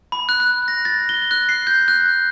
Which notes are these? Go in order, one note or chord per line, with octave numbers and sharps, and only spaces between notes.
B5
F#6
F#6
A#6
A6
G7
F#6
C7
G6
F#6